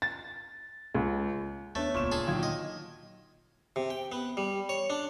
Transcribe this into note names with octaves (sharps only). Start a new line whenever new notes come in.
A6
C#2
D#2 A3 B3 D4 C#5 A6
D#1 C#2 A#2 C#6 E7
G#4 A4
A#2 D3 D#3 F#3 F4 G#6
D#5
C3
G5
B3
G3
C#5
D4